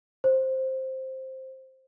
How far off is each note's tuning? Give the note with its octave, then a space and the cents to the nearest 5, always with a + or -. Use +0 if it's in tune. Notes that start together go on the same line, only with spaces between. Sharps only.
C5 +5